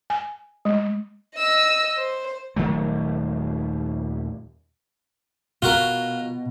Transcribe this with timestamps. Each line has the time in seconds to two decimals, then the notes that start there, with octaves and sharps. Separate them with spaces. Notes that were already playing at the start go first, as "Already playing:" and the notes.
0.10 G#5
0.65 G#3
1.36 D#5 E6
1.97 C5
2.56 D#1 D#3 F#3 A3
5.62 B2 F4 F#4 A#4